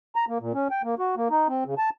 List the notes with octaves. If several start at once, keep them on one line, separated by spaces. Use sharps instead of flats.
A#5
A#3
A#2
C#4
G5
A#3
F#4
A#3
D#4
C4
C#3
A5